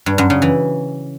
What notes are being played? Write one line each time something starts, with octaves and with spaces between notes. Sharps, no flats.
G2
F#2
C#3
E3